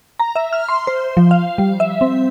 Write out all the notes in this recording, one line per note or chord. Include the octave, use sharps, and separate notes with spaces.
A#5
E5
F6
C6
C5
F3
F5
G3
E5
C4